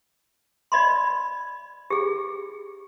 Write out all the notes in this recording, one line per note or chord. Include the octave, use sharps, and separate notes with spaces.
D5 D#5 B5 C6
G4 G#4